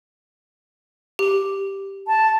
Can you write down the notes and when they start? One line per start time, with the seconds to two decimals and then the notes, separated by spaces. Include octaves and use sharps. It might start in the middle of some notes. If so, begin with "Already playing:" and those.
1.19 G4
2.07 A5